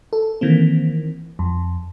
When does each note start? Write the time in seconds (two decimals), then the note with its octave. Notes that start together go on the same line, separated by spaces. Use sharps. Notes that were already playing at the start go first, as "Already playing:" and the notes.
0.13 A4
0.41 D#3 E3 A#3 C4
1.39 F2